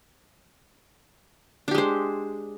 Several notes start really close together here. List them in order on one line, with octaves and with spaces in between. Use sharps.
D4 G4 G#3 C5